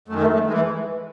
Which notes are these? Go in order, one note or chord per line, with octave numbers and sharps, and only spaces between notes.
F#2 D#3 A3
A3
A3
G#3
E3